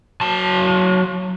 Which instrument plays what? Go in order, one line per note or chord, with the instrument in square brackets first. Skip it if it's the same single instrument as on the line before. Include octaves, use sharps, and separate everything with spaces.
[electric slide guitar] F#3 A5